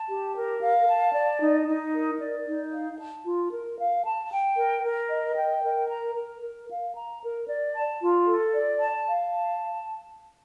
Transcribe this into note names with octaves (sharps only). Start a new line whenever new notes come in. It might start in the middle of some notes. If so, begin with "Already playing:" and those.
Already playing: A5
G4
A#4
F5
A5
D5
D#4
D#4
A#4
D5
D#4
F5
A5
F4
A#4
F5
A5
G5
A#4
A#4
D#5
G5
A#4
A#5
A#4
A#4
F5
A#5
A#4
D5
A5
F4
A4
D5
A5
F5
A5